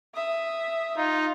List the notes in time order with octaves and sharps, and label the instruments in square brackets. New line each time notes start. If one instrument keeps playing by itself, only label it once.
[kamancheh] E5 D#6
[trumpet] D#4 [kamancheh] F4